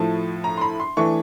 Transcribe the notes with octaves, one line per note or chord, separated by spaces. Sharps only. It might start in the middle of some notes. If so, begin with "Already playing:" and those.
Already playing: A2 F3 A3 A5
A#5
C6
B5
C6
E3 A3 D4 C#6